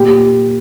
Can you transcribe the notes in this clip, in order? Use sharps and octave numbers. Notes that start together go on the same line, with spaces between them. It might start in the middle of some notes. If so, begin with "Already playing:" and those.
Already playing: A#2 G4